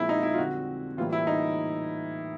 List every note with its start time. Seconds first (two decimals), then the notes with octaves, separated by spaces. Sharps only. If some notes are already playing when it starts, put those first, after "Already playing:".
Already playing: A#2 F3 G#3 C4 E4
0.09 D#4
0.23 E4
0.34 F4
0.38 F2 D3 G3 C4 F#4
0.97 A2 E3 G3 A#3 F4
1.12 E4
1.27 D#4